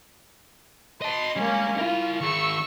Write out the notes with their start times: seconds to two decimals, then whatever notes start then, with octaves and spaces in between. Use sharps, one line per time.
1.02 D#5 A5 C6
1.36 G3 G#3 A#3 C#4
1.79 E4 F4 A#4
2.21 D#3 G#4 C#6 E6